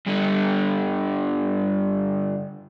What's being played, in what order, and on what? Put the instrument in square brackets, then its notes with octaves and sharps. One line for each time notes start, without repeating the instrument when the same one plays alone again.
[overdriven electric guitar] G2 D3